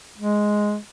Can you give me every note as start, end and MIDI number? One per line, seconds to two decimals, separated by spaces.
0.18 0.76 56